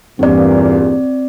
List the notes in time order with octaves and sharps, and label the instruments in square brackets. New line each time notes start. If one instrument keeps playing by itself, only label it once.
[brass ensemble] E2 G2 A#2 [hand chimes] C4 D5